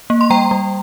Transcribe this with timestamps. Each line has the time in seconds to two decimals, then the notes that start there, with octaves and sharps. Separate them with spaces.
0.10 A#3
0.21 C6
0.30 G3 G5 A#5
0.51 G3